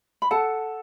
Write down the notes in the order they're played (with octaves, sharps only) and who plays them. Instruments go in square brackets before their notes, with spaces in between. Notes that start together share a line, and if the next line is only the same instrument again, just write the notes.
[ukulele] B5
[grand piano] A4 [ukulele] F#5 A5